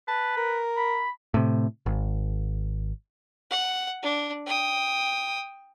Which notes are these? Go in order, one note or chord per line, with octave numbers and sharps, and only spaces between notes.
B4 A5
A#4
B5
A2 C3
G#1
F#5
D4
G5 D#6